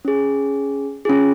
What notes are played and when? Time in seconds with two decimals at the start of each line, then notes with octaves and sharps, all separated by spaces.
0.05 C#4 G#4
1.05 C#4 F4 G#4